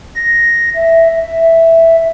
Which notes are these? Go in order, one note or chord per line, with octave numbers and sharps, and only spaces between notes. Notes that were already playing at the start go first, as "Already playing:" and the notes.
A#6
E5
E5